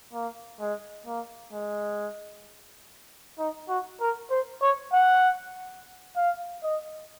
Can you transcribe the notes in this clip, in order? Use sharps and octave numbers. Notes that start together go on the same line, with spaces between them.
A#3
G#3
A#3
G#3
D#4
F#4
A#4
C5
C#5
F#5
F5
D#5